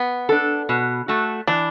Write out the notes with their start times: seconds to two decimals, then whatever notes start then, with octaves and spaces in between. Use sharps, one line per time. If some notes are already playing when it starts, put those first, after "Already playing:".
Already playing: B3
0.29 D4 A4
0.69 B2
1.08 A3 F#4 A4
1.48 E3 D4